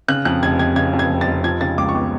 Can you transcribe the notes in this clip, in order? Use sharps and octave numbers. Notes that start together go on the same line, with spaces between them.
C#3 F#6
F2 F#6
F1 G#6
F1 G#6
C#3 G#6
F2
G#6
F1
A6
F1
F3 G#6
C#3 A6
C#2 D6
C#6
B3 D6